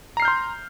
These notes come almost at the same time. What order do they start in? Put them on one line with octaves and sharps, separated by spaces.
A#5 C7 F6 G6 C6